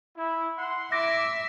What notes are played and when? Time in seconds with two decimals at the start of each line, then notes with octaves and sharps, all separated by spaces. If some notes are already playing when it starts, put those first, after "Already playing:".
0.17 E4
0.58 F#5 C6
0.92 E4 E5 D6 A#6